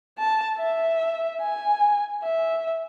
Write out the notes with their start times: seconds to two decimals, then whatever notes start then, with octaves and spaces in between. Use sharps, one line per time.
0.19 A5
0.58 E5
1.42 G#5
2.23 E5